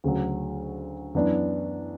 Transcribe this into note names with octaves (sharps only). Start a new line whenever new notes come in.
D2 C#3 F#3
F#2 E3 B3 D4